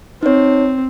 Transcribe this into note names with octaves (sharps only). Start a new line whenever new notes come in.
C4 D#4 C#5